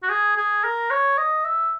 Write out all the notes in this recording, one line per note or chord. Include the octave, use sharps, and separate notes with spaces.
F#4
G#4
G#4
A#4
C#5
D#5
E5